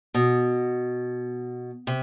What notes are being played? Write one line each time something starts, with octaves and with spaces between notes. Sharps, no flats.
B2
C3